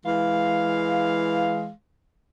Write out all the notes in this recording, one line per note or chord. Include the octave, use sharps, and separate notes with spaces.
E3 G#3 F5